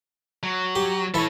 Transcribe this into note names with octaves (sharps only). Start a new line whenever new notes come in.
F#3
G4
E3 E4 A4 C#5